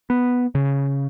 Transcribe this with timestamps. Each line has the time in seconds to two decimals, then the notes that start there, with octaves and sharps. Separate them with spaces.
0.10 B3
0.55 C#3